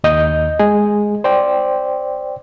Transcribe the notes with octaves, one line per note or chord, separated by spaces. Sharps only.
D#2 D#5 G6
G#3 G#4
C5 D5 G5